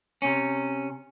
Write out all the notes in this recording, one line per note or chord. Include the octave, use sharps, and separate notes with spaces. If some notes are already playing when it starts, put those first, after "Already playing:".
C3 C#4